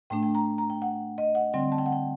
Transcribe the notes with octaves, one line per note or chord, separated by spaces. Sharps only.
A2 A3 D4 G5
G5
A#5
A#5
G5
F#5
D#5
F#5
D3 G3 C4 G5
A5
G5
F#5
G5